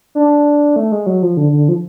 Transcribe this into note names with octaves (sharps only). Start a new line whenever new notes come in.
D4
A3
G#3
F#3
F3
D3
D3
F3